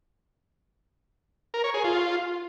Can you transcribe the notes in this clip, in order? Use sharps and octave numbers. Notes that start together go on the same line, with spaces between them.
A#4
C#5
G#4
F4